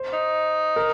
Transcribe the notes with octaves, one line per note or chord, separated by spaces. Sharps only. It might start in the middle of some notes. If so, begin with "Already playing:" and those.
Already playing: C5
D#4
A#4